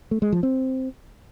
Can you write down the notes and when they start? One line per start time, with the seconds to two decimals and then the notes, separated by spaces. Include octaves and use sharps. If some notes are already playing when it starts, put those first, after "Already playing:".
0.11 A3
0.22 G#3
0.32 F3
0.43 C4